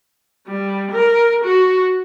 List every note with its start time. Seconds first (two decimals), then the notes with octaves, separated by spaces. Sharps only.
0.47 G3
0.91 A#4
1.44 F#4